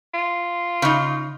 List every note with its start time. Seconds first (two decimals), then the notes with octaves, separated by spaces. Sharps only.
0.14 F4
0.82 C#3 D#4